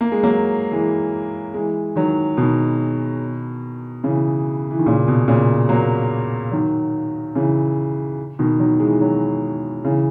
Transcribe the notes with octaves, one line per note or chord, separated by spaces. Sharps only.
A#3
G#3
F#3 A#3
E3 G#3
E3 G#3
D#3 F#3
B2 D#3
C#3 E3
E3
D#3
A#2 C#3
B2
A#2 C#3
F#3 A#3
D#3 F#3
C#3 E3
B2 D#3
D#3 F#3
E3 G#3
D#3 F#3
C#3 E3